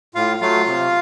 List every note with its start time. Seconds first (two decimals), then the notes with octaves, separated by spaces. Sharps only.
0.15 A2 F4 F5
0.41 F#3 A3 F4 F5
0.67 C3